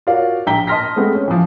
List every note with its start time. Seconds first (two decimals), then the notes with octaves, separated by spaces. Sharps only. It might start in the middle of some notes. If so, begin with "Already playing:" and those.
0.07 F4 F#4 A#4 C#5 D5 F5
0.47 A#1 G5 A#5 B6 G7
0.67 D#5 A5 C6 F6 A#6 B6
0.96 G#3 A3 B3 C4
1.14 C#4
1.28 E3 F3